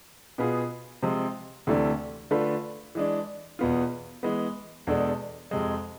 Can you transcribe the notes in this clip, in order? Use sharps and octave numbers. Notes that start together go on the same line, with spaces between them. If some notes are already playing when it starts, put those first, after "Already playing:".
B2 B3 F4 G#4
C3 F3 G#3
D2 C3 E3 A3 D4
D3 A3 D4 F4 B4
E3 G#3 D4
E2 B2 B3 F4
E3 G#3 B3
E2 B2 G#3 D4 A4
F2 C3 G#3